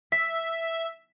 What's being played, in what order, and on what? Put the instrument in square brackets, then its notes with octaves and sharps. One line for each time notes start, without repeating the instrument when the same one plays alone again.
[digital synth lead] E5 [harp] B6